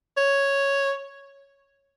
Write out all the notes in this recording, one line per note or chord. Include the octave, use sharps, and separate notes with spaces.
C#5